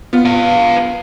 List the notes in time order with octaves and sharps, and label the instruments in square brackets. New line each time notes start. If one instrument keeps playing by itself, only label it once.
[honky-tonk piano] B3 F4
[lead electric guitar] B4 F5